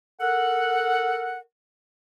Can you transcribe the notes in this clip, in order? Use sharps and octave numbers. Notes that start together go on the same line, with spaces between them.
A4 A#4 F#5